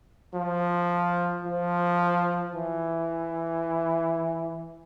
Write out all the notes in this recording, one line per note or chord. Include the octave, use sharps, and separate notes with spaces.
F3
F3
E3